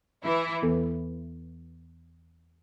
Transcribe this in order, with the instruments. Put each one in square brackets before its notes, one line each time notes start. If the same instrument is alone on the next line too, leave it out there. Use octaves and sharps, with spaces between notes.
[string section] E3 E4
[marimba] E2 E3 B3 A4